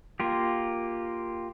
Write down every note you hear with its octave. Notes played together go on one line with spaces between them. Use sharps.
A#3 F4 G4